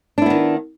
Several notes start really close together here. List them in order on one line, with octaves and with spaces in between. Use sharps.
D4 E4 B3 D#3